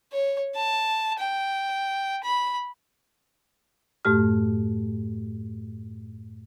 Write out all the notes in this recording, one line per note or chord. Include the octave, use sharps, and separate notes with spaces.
C#5
A5
G5
B5
F#2 A2 A3 G4 F6